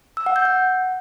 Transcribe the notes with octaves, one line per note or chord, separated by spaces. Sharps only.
E6
F#5
G6
F#5